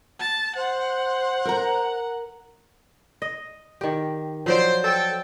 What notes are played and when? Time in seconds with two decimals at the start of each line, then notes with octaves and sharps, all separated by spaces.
0.19 A5
0.56 C5 F#5
1.45 A#4 A#5
3.22 D#5
3.81 D#3 G4
4.46 F3 F#3 C5 D5
4.84 A4 G5